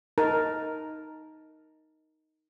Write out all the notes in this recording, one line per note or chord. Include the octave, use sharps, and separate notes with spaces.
D#4 A#4 A5